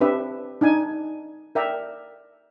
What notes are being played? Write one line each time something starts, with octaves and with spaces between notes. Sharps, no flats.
C4 D4 G4 B4 E5
D4 D#4 G#5
A#4 D5 E5 G5 A#5